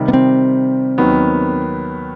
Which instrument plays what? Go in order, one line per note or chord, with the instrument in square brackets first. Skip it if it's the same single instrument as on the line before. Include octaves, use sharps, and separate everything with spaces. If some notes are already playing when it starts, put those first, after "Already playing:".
Already playing: [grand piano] C3 D#3 G3
[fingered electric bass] B3
C4
[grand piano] D#2 D#3 F#3 B3